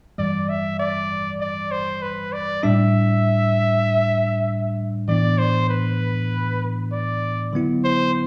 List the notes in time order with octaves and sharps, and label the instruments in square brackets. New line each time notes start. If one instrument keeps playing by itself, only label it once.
[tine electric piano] G2 E3 G3 [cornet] D5
[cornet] E5
D5
D5
C5
B4
D5
[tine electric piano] A2 G3 D4 [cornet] E5
[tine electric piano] A2 E3 B3 D4 [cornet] D5
[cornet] C5
B4
D5
[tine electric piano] D3 F#3 B3 E4
[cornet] C5